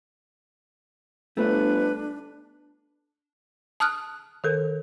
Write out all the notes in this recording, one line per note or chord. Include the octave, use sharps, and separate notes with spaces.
G1 A3 D4 B4
A5 D#6 F6 F#6
D#3 A4 A#4